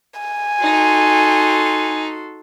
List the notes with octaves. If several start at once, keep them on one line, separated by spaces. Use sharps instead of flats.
G#5
D#4 F#4 A4 C6